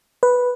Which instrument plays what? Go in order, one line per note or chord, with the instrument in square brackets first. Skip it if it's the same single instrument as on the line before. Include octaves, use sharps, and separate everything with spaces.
[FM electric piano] B4